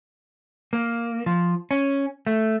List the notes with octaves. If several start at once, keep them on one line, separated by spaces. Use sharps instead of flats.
A#3
F3
C#4
A3